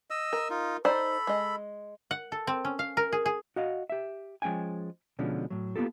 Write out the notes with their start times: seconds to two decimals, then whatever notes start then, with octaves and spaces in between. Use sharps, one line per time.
0.10 D#5 E6
0.33 A#4
0.50 D#4 F4
0.85 D#4 A4 C5 D5 B5
1.27 G#3 D#5
2.11 F#5
2.32 A4
2.47 C4
2.65 C#4
2.79 F5
2.97 A#4
3.12 G#4
3.26 G#4
3.56 F#4 D#5 F5
3.90 G4 E5
4.42 F3 G#3 C#4 G5 G#5
5.19 B2 D3 F3 G#3 C#4
5.50 A2 F#3
5.76 A#3 B3 F4 G4 A4